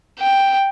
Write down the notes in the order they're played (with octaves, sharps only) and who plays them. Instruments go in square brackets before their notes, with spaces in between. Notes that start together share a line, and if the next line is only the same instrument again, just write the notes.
[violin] G5